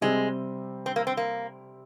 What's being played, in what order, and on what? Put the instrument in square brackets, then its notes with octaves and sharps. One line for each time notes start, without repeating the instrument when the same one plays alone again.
[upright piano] C3 G3 C4 [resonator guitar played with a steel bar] G#3
[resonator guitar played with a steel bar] C4
A#3
C4
A#3